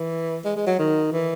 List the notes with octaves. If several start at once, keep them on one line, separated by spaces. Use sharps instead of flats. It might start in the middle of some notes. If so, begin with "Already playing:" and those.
Already playing: E3
G#3
G#3
F#3
D#3
E3